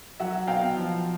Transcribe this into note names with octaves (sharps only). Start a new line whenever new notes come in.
F#3 E5 F#5
B2 F5 G5
F3